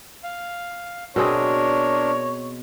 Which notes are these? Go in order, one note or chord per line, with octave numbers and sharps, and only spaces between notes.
F5
B2 C4 D4 G#4 A#4 C#5